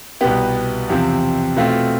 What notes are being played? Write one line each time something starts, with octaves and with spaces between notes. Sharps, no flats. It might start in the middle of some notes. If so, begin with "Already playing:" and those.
C2 B2 B3 G4
E2 C3 F3 C4 G4
B2 A3 C4 F4
F4